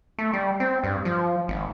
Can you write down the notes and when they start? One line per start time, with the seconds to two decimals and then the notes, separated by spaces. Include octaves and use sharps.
0.18 A3
0.33 G3
0.60 C4
0.84 G2
1.05 F3
1.48 G#1